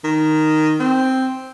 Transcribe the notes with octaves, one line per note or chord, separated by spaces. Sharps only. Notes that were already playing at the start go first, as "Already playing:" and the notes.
D#3
C4